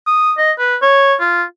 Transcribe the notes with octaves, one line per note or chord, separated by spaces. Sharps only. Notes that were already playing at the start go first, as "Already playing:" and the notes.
D#6
D#5
B4
C#5
F4